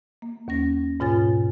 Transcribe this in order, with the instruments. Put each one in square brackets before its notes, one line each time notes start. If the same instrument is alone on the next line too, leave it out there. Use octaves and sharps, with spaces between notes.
[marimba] A#3
D#2 C#4 A#6
G#2 B2 F4 C#5 G#5 A6